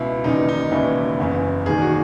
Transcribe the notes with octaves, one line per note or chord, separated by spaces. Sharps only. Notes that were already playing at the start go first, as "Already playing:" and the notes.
Already playing: C#2 B2 E4
E1 D#2 C#3 E3 D#4
D#4
E1 D#2 C#3 E3 E4
F#1 E2 C#3 E3
E1 D#2 D#3 G#4
F#4